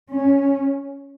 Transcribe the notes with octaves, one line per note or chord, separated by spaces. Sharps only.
C#4